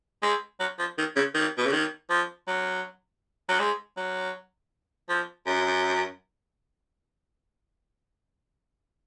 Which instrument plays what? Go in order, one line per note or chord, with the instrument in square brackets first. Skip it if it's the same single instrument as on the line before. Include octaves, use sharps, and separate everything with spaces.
[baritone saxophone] G#3
F#3
F3
D#3
C#3
D#3
B2
C#3
D#3
F3
F#3
F#3
G#3
F#3
F3
F#2